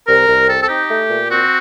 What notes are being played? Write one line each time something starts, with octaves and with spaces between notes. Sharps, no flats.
C2 A#4
C2
C4 A4
A4
D#4 G4
A3
A#2
C4 F#4